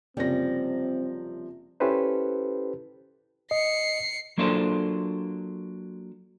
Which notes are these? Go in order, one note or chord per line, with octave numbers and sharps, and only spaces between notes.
F#1 C3 F3 G3 C4 C#4 A#6
C#4 E4 G4 A4 B4 C5
D#5 C7 C#7
F#3 A#3 D4 F4 A4 C5